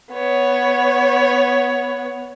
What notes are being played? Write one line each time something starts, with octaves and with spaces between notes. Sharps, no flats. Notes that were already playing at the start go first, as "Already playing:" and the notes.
B3 C#5